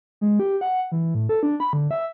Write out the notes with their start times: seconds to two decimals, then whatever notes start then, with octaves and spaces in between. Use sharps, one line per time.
0.21 G#3
0.40 G4
0.61 F#5
0.92 E3
1.15 A2
1.29 A4
1.43 D4
1.60 B5
1.73 D3
1.91 E5